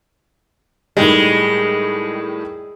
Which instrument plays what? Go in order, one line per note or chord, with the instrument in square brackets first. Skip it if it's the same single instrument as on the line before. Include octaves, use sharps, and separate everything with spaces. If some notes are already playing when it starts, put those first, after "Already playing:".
[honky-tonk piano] A2 D#3 G3 [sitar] G#3